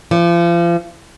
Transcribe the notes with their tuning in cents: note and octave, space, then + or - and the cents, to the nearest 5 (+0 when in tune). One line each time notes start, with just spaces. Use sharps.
F3 -35